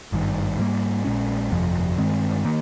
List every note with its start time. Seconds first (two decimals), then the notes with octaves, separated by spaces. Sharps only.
0.12 G#1 G2 D#3
0.59 G#2 G3 A#3
1.04 A#1 A#2 G#3 C#4
1.51 G1 F2 C3 F3
1.97 G2 D#3 G#3 C4
2.45 D#3 A#3